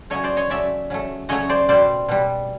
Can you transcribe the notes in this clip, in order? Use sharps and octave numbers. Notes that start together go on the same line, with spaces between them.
C#3 F#3 A3 C#5 D#5
C5 D5
C#5 D#5
C#3 F#3 A3 D5 E5
C#3 F#3 A3
C#3 F#3 A3 C#5 D#5
C5 D5
B2 G3 C5 D5
B2 G3